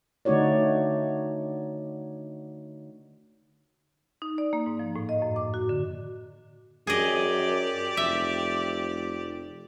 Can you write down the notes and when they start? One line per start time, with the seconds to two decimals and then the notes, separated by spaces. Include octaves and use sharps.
0.25 D3 A3 D#4 F#4 C#5 D5
4.22 D#4
4.38 D5
4.53 A#3
4.66 G#2
4.79 F3
4.96 A2
5.09 D#5
5.22 F#2
5.36 D6
5.54 F#4
5.69 D3
6.87 F#2 G4 G#4 D5 D#5
7.97 F1 E5